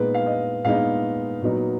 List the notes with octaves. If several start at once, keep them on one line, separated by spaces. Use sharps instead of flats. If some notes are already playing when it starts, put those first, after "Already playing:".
Already playing: A#2 G#3 B3 D#4 B4
F5
D#5
A#2 G#3 B3 D#4 F5
A#2 F#3 B3 D#4